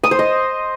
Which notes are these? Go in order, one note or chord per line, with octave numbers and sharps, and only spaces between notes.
D#6
C5
D#5